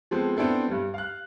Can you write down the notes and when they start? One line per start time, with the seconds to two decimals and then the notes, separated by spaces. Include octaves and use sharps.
0.11 F3 G#3 B3 C4 A4
0.37 B3 C4 D4 E4 A4
0.68 G2 G3
0.94 F5 F#6